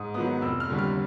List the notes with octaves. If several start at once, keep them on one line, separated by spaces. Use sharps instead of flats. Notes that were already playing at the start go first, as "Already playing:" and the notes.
Already playing: G#2 D#6
D#3 F#3 B3 D#6
F1 E6
F6
D#2 D3 G3
F6